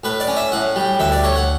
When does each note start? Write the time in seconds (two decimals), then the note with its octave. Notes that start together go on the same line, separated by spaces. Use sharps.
0.04 A2 B4
0.20 D5
0.28 C#4
0.36 E5
0.52 A2 F#5
0.76 G3
0.99 D2 E5
1.12 D5
1.24 A3 C#5
1.36 F#5